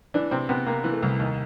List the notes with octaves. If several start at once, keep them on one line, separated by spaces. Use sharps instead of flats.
E3 D4
C3 C4
C3 B3
C3 A#3
E3
A3
C2
D#2